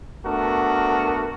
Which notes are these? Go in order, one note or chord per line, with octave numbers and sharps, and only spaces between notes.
A3 B3 D4 F#4 A#4